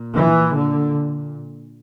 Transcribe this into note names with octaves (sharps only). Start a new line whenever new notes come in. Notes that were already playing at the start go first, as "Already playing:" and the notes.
Already playing: A#2
E3
D3